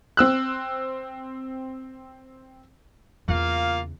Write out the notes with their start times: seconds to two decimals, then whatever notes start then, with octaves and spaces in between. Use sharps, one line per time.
0.17 C4 E6 F#6
3.28 E2 C#3 A#3 F4 F5